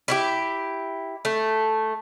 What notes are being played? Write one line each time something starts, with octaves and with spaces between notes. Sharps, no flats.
E4 F4 G4
A3